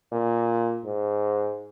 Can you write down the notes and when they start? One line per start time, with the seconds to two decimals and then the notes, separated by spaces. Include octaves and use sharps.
0.12 A#2
0.85 G#2